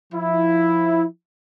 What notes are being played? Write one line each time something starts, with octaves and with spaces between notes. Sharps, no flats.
F3 E4